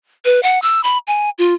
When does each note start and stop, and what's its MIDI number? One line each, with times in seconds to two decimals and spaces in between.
0.25 0.40 71
0.43 0.61 78
0.62 0.81 88
0.84 0.98 83
1.07 1.30 80
1.38 1.54 65